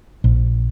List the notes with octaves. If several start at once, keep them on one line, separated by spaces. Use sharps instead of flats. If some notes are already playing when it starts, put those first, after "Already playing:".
A#1